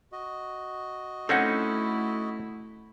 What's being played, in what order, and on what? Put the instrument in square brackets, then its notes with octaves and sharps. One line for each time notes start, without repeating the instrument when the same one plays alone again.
[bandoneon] F#4 D#5
[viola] A3 E4 [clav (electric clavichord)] C4 C#4 D#4 [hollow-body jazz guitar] A4 F#5